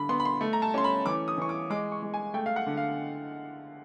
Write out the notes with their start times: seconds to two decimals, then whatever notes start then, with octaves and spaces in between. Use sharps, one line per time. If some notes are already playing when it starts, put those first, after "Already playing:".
Already playing: D3 B5
0.09 B3 C6
0.20 B5
0.25 C6
0.41 A3
0.53 A#5
0.62 A5
0.74 C#4 C6
0.84 B5
1.06 E3 D6
1.28 D#6
1.38 E3 C#6
1.49 D6
1.70 G#3 D6
1.92 C#6
2.02 G#3
2.14 G#5
2.34 A3 G5
2.46 F5
2.56 F#5
2.66 D3
2.77 F5